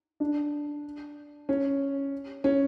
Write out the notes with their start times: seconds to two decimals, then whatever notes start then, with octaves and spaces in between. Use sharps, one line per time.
0.20 D4
1.49 C#4
2.44 C#4